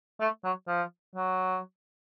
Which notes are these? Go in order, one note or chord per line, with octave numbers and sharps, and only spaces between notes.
A3
F#3
F3
F#3